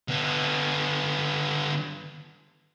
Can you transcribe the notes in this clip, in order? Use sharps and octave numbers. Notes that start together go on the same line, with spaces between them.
D3 B3